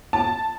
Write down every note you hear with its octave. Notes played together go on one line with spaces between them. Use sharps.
A5